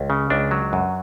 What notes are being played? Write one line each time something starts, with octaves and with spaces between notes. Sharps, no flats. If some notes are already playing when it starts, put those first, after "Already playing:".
Already playing: C#2
C#3
C#2 D4
F#3
F#2